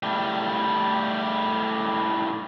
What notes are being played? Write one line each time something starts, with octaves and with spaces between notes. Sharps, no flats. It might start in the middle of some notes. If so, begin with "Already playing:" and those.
A2 G3